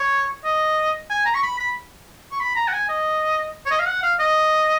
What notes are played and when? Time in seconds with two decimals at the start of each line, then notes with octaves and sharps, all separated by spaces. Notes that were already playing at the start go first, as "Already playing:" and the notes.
Already playing: C#5
0.45 D#5
1.10 G#5
1.26 A#5
1.35 C#6
1.43 B5
1.59 B5
2.32 C#6
2.40 B5
2.56 A#5
2.68 F#5
2.73 G#5
2.89 D#5
3.66 C#5
3.71 D#5
3.79 F5
3.87 F#5
4.03 F5
4.19 D#5